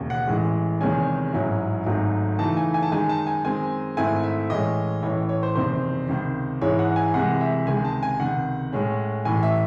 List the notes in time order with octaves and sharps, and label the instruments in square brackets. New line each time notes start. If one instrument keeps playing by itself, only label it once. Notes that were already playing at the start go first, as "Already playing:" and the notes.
Already playing: [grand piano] E1 D#2 C#3
F#5
A1 A2 E3 G#3
E2 C3 D#3 G#3 C#4 G#5
A1 G#2 F#3 C#4 E4
G#1 G#2 F#3 A3 D#4
F#2 C#3 E3 A3 D#4 A5
G#5
G#5
A5
F#2 D#3 G#3 D#4 G#5
A5
G#5
F#2 D#3 G#3 C4 G#5
G#2 D#3 A3 C4 E4 G#5
E5
A2 E3 G#3 C#4 D#5
A1 A2 E3 C#5
C#5
C5
F#1 E2 C3 D#3 C5
C#2 C3 D#3
G#2 E3 G#3 C#4 E4 C#5
F#5
G#5
C2 C3 E3 G#3 F#5
E5
C#2 C3 D#3 G#3 G#5
A5
G#5
C#2 C3 D#3 F#5
A2 G#3 C#4
A1 A2 E3 G#5
E5